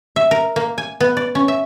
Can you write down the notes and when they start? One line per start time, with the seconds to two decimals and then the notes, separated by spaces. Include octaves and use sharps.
0.16 E5
0.31 A#4
0.56 A#3
0.78 G#5
1.00 B3
1.17 D5
1.35 C#4
1.48 E5